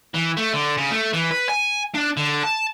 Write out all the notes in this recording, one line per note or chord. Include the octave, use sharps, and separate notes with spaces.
E3
A3
D3
C#3
A3
E3
B4
G#5
D4
D3
A5